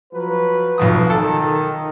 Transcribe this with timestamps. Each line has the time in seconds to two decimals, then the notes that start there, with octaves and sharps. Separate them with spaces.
0.13 F3 F#3 B4
0.78 B1 F2 D#6
1.10 D#3 A4